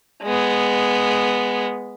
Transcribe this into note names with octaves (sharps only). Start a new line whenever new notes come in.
G#3 B3